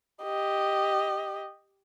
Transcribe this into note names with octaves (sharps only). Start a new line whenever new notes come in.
G4 D#5